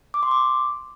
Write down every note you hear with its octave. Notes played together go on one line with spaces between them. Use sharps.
D6
C6
D6